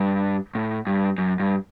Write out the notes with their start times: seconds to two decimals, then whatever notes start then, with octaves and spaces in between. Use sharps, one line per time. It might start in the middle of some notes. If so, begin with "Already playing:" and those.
Already playing: G2
0.55 A2
0.87 G2
1.18 F#2
1.40 G2